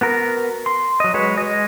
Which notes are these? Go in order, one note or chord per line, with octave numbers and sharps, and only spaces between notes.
B3 F#4 A#4
C6
F#3 D#5
F#3 G#3 F#4 B4 C#5
G#3 D#5